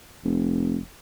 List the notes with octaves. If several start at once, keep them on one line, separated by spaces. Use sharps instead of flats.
F1